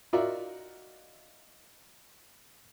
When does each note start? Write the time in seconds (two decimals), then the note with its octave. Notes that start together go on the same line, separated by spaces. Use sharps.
0.13 D#4 F4 F#4 A#4 D5 E5